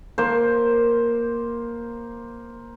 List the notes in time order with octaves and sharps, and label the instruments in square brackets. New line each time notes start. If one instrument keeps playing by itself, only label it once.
[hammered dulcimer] A#3 C5